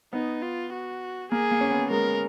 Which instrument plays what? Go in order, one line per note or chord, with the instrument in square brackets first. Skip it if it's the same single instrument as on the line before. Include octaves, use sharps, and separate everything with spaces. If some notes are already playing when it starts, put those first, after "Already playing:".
[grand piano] B3 [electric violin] D#4
[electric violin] F4
F#4
[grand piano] A#3 [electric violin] G#4
[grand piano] A#3
C#4
B3
[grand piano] G#3 [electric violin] A#4